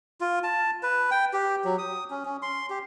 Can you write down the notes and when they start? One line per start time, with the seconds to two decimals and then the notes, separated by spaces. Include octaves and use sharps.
0.21 F4
0.43 A5
0.83 B4
1.11 G5
1.33 G4
1.65 F#3
1.78 D#6
2.10 C#4
2.25 C#4
2.42 C6
2.70 G4